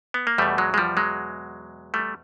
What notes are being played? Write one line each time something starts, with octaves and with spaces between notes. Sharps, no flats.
B3
A#3
E2 B2 G3 A3
F#3 G#3
G#3
F3 G3
F#3 G#3
G3 A3